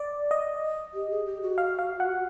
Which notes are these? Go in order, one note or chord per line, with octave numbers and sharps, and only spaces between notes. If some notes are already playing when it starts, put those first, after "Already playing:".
Already playing: D5
D#5
G4
G#4
G4
F#4
F5
F5
F#5